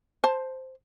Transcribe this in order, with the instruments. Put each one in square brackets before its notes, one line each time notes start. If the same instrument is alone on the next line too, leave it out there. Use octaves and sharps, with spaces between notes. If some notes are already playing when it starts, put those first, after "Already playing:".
[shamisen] C5 A5